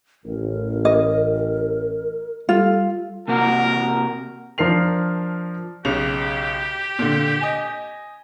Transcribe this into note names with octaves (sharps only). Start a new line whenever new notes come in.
A1 A#4
D#5
G3 F4 A4
C3 A#3 F#4 A#4
F3 D4 A#4 C7 F7
B1 C#3 G4 F7
A#2 D3
D#5 G#5